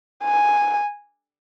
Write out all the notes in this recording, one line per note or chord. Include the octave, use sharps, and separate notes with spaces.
G#5